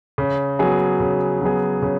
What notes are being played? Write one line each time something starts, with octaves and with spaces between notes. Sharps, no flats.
C#3
F#3 B3 G#4
C#3
F#3 B3 G#4
C#3